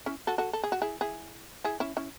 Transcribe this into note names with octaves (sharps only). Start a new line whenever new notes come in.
C#4 E4
F#4 A4
F#4 A4
A4
G#4
F#4
E4 G#4
E4 G#4
E4 G#4
C#4 E4
C#4 E4